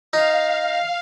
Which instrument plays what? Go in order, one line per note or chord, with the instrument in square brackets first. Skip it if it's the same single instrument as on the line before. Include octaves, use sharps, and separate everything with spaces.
[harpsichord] D#4 [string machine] F5